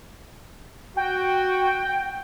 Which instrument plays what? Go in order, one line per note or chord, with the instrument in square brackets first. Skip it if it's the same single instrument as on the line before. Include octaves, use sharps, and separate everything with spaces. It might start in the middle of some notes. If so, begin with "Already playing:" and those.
[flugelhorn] F#4 [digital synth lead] G5